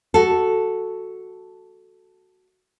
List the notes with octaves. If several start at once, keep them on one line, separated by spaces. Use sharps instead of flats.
F#4 A4